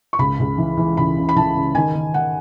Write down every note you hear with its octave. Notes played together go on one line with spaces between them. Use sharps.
C#6
C#2 B5
C#2
E3
E3
C#2 B5
C#3
B5
E3 A5
C#3
D#3 G#5
D#3
D#3 F#5